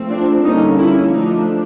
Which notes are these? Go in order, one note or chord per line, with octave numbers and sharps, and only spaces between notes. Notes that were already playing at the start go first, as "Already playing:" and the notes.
Already playing: F3 A3 C4
D4
D3 G3 A#3 C#4 D#4
E4
F3 A3 D4 D#4